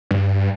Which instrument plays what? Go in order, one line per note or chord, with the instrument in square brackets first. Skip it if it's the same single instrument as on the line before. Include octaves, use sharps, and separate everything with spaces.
[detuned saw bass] G2